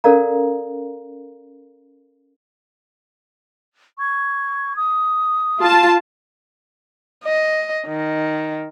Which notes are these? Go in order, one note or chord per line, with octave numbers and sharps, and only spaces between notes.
C#4 A4 A#4 D5 F5 A#5
C#6 G#6
D#6
F4 A5
D#5
D#3